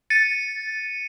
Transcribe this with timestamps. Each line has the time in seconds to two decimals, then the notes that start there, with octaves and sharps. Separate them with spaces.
0.10 A6 C#7 D#7